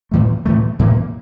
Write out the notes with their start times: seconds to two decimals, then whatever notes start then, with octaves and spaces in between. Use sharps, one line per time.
0.11 A2 E3 A3
0.46 A2 E3 A3
0.79 A2 E3 A#3